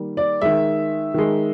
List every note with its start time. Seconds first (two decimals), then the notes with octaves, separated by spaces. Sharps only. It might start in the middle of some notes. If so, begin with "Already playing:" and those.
Already playing: D#3 G3 A#3
0.17 D5
0.41 D#3 G#3 E5
1.14 D#3 G#3